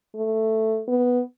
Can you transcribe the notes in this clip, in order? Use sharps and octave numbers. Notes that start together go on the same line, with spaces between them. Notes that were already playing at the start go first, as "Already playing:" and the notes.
A3
B3